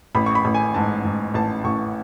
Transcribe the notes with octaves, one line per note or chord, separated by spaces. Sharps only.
A1 B5
C#6
B5
A1
G#5
G#2 A5
G#2
A1 A5
A1 C#6